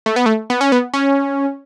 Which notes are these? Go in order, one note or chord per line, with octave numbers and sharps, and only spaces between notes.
A3
B3
A3
B3
C#4
B3
C#4